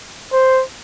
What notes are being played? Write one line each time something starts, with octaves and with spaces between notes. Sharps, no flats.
C5